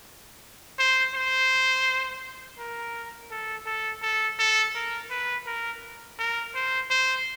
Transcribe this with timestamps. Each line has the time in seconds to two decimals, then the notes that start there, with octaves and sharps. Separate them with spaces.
0.79 C5
1.15 C5
2.59 A#4
3.31 A4
3.66 A4
4.02 A4
4.39 A4
4.75 A#4
5.11 B4
5.46 A#4
6.19 A#4
6.55 C5
6.90 C5